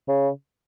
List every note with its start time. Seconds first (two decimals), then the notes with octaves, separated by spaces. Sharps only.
0.08 C#3